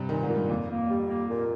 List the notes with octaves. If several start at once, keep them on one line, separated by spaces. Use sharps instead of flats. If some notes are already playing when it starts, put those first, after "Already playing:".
Already playing: G2 C3
A#2 D#3
G#2
A#2
G2
F2 A#3
A#3
G3
A#3
A#2